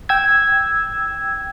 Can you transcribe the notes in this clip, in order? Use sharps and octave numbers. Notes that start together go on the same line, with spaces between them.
G5 E6 G#6